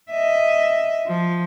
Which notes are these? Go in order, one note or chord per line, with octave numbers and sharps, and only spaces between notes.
D#5 E5
F3